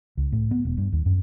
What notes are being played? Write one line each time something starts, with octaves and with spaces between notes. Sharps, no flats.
C#2
A2
B3
E1
G2
D#2
F#2